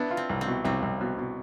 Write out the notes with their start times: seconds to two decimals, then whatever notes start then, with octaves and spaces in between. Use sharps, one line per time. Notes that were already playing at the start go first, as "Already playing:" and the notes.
Already playing: B3 D4 E4
0.11 F4
0.17 C4
0.29 C2
0.41 C4
0.47 B2
0.64 C2 C4
0.82 C2
1.01 B2
1.18 B2